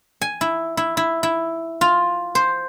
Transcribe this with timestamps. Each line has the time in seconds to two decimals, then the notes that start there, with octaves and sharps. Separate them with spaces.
0.22 G#5
0.41 E4
0.77 E4
0.97 E4
1.23 E4
1.81 F4
2.35 C5